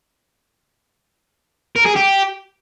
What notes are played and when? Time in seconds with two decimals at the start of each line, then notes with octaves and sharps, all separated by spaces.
1.76 A#4
1.86 G#4
1.96 G4